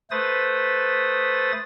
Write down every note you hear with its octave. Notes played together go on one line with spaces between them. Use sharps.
A3 B4 C5 D#6 A6